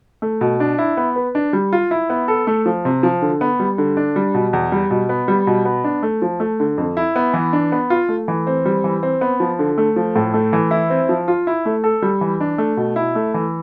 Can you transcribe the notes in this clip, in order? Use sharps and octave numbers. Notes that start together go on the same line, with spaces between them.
A3
B2
D4
E4
B3
B4
D4
G3
F4
E4
B3
A4
A3
F3
C3
F3
D3
B3
G3
D3
D4
G3
B2
E2
G3
B2
B3
G3
B2
B3
D4
A3
F3
A3
D3
F2
E4
B3
E3
D4
B3
F4
A3
E3
C4
G3
E3
C4
B3
F3
D3
A3
F3
A2
A3
E3
E4
C4
F3
F4
E4
A3
A4
G3
E3
D4
A3
B2
E4
A3
E3